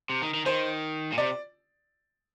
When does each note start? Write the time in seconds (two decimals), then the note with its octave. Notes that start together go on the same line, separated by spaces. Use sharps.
0.10 C3
0.22 D#3
0.34 D#3
0.46 D#3 C5
1.12 A#2
1.18 C3 D5